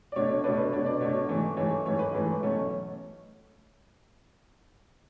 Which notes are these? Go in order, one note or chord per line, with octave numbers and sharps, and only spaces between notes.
D5
B2 A3 D4 C#5
C#5
B2 A3 D4 B4
B4
B2 A3 D4 C#5
D5
B2 A3 D4 C#5
G#2 E3 A3
G#2 E3 A3 C#5
G#2 E3 A3 C#5
B4
G#2 E3 A3
B2 F#3 A3 C#4